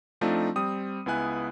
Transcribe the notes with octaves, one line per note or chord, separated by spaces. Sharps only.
F3 A3 C4 D4 D#4 F4
G3 C4 D#6
C#2 B3 E4 G#5 F#6